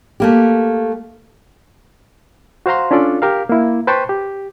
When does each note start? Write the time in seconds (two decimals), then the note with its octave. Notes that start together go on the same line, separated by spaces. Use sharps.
0.20 A3 A#3 G4
2.66 F#4 C5 F5 A#5 C6
2.91 C#4 D4 F4 A4 D5
3.22 G4 A#4 F5
3.49 A#3 E4
3.87 B4 C5 G5 A5 B5 C#6
4.09 G4